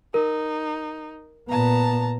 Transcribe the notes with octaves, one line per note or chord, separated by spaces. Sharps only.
D#4 A#4
A#2 B3 A5 A#5